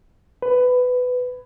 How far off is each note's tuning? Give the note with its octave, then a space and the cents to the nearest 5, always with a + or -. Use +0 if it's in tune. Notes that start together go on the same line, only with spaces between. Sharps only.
B4 +15